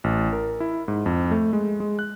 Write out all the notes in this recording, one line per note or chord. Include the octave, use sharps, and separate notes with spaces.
A1
A#4
E4
G#2
F2
A3
G#3
G#3
F#6